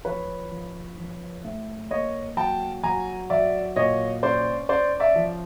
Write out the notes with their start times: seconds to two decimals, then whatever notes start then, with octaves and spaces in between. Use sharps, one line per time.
0.05 F3 B4 C#5
0.51 F3
0.98 F3
1.44 A2
1.91 A#3 C#5 D#5
2.37 F#3 G5 A5
2.83 F#3 G#5 A#5
3.30 F#3 D5 E5
3.76 A#2 C#5 D#5
4.23 C#4 C5 D5
4.69 C#4 C5 D5
5.00 D5 E5
5.16 F3